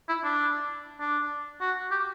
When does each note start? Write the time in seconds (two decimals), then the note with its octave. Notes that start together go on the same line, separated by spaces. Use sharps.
0.09 E4
0.24 D4
1.00 D4
1.61 F#4
1.91 G4